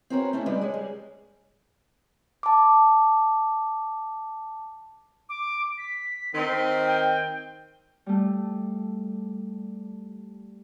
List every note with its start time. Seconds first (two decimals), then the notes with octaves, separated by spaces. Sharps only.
0.10 C4 F#4 G#4 A#4 B4 C#5
0.33 A3 C#4 E4
0.46 G3 G#3 G4 B4 D5
0.61 G#3 B4 C#5
0.74 G3 G#4
2.43 A5 D6
5.29 D6
5.78 B6
6.34 D#3 C4
6.87 G5
8.06 G3 A3